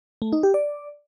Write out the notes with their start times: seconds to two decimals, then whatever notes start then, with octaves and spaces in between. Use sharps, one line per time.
0.22 A3
0.32 D#4
0.43 G4
0.54 D5